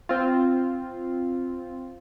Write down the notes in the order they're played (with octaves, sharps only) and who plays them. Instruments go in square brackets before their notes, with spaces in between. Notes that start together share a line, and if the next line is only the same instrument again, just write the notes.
[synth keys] C4 F4